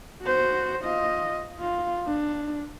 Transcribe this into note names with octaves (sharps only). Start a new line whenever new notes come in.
F#4 C5
F4 D#5
F4
D4